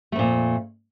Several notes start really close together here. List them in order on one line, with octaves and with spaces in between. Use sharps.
A3 F2 A#2